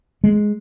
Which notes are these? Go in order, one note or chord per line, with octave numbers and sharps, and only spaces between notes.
G#3